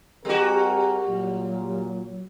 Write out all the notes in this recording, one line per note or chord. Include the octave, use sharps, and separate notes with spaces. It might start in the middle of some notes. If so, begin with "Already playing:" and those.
G3 C4 F#4 G#4 A#4
A#2 F#3